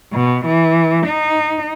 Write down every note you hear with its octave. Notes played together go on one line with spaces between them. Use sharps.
B2
E3
D#4